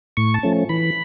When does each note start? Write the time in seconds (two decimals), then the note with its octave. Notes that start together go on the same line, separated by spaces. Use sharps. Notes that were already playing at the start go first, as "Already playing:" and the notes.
0.17 A2 C#6
0.34 A5
0.43 F3 A3 C#4
0.69 E3 B5